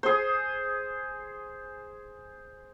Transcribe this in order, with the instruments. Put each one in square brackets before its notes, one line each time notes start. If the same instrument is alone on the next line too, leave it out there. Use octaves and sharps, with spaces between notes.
[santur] G#4 C5